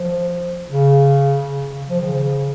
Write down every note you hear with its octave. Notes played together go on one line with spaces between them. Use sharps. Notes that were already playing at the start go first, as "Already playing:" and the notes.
Already playing: F3
C#3
C#3
F3
D#3
C#3